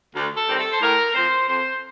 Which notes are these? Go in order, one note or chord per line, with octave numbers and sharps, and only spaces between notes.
D2
A4
C3 D#3 G3 C4
A4
C5
A2 A#4
F3 C4 C5
F2 C5